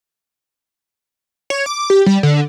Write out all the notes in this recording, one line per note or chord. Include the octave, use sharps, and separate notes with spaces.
C#5
D6
G4
G3
D3